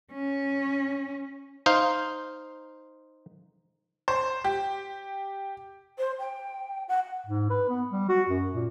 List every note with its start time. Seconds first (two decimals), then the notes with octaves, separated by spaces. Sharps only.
0.13 C#4
1.66 D#4 C5 F5
4.08 C5
4.44 G4
5.98 C5
6.19 G5
6.88 F#5
7.26 G#2
7.50 B4
7.69 B3
7.91 G3
8.09 F#4
8.29 F#2
8.53 A#2